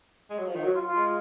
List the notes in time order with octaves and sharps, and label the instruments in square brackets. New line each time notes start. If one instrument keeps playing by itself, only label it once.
[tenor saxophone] G#3
F#3
F3
D#3
[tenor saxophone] F#3 [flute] F#4
[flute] F4
F4
[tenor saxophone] G#3